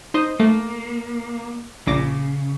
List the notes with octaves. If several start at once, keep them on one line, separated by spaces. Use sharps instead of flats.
D#4 C5 D#5
A3 A#3
A#1 C#3 D6 A#6